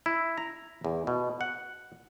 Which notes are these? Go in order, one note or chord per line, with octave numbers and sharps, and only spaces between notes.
E4
A#5
E2
B2
F#5